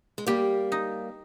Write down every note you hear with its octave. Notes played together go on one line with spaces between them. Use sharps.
G#3
G3 A#3 G4
D#4